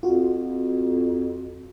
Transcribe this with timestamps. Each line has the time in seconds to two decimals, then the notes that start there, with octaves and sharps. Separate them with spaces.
0.03 F2 F4 F#4